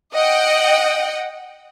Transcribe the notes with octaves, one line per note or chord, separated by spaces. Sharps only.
D#5 F#5 G5